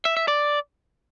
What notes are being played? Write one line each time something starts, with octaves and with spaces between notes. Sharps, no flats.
E5
E5
D5